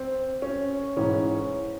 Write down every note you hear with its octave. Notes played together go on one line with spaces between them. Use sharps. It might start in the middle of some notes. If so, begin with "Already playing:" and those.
Already playing: C4
C#4
G#2 E3 C#4